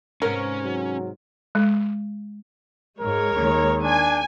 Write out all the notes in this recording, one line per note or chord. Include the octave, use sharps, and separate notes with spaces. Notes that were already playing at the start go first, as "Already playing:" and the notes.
G#2 C3 B3 C#4 A#4
F#3
G#3
G#2 G#3 A#4 C#5
D#2 D#3
D4 G#5